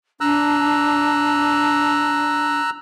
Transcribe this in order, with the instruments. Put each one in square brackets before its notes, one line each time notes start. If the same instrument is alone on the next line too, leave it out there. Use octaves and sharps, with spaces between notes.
[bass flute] D4 [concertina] A#5 E6 F#6